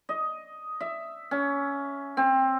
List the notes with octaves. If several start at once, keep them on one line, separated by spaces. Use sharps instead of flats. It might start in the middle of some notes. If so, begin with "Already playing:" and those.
D#5
E5
C#4
C4